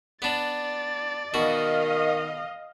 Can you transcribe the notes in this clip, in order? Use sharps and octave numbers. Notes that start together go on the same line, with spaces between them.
B3 D4 D5 A6
B2 D#3 F#4 D#5 F5